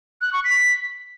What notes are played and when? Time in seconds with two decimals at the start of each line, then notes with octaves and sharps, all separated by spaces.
0.21 F#6
0.33 C#6
0.44 B6